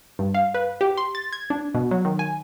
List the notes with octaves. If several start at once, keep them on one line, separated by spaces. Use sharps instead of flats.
G2
F5
B4
G4
C6
A6
G#6
D4
B2
F#3
D#3
G#5